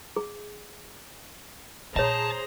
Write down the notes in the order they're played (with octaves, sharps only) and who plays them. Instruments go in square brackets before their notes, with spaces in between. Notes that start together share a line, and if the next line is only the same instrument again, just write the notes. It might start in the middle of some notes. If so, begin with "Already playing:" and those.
[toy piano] G#4
[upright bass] A#2 [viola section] G#4 C5 A#5 [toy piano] C#5 E5 [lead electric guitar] A5